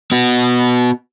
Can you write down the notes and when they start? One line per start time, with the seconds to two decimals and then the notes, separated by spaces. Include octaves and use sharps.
0.12 B3 F#4